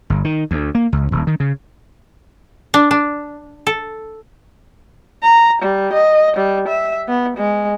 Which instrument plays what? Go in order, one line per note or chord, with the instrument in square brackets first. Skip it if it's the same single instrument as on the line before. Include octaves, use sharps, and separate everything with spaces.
[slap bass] G1
D#3
D2
A#3
C#2
D#1
D#3
C#3
[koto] D4
D4
A4
[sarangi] A#5
G3
D#5
G3
E5
B3
G#3